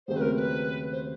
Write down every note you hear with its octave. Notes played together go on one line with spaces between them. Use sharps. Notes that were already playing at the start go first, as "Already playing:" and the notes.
D#2 C#3 F#3 A3 C4 C5
B4
A#4
B4
C5